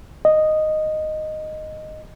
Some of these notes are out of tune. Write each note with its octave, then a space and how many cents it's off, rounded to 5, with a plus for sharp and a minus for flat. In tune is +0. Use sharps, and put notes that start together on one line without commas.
D#5 -5